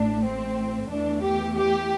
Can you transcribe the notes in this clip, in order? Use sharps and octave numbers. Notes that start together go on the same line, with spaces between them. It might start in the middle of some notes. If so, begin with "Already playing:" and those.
Already playing: A1 A2 A3 D4
C4
E2 E3 A3 D4
G4
G4